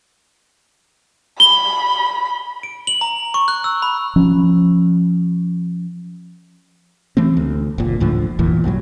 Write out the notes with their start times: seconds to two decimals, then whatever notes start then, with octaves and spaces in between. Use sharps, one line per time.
1.40 B5 G7
2.63 D7
2.87 F#7
3.01 A#5
3.34 C#6
3.48 F#6
3.64 E6
3.82 B5
4.16 F3 C#4
7.17 E3 A3 C4
7.37 D2
7.78 F#1 A#2
8.00 D2 A2 D3 F3
8.39 G1 E2 A#2 E3
8.64 B1 G2 F3 F#3